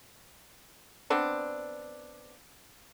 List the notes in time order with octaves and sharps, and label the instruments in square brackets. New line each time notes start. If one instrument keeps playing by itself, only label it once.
[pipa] B3 C4 D4